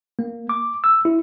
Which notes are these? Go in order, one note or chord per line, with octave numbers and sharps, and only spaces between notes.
A#3
D6
E6
E4